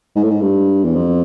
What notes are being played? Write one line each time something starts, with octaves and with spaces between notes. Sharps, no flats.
G#2
A2
G#2
G2
E2
F2